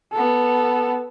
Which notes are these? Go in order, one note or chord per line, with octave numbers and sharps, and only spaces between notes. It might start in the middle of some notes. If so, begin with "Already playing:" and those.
B3 A4